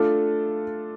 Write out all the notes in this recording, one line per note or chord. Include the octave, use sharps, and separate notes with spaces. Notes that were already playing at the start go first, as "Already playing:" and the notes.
Already playing: A3 D4 F4 A4